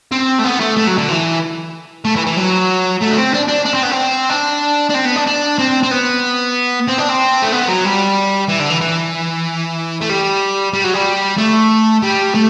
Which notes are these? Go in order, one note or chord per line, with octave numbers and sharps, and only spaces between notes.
C4
A3
B3
A3
A3
F#3
D3
E3
A3
E3
E3
F#3
A3
D4
C4
D4
D4
D4
C4
B3
C4
D4
D4
C4
B3
D4
D4
C4
C4
B3
C4
D4
C4
A3
B3
F#3
G3
E3
D3
E3
E3
A3
G3
G3
F#3
G3
A3
G3
A3